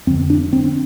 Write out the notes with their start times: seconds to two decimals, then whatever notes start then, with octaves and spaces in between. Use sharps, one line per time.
0.07 F2 C4
0.10 D3
0.30 D4
0.53 C4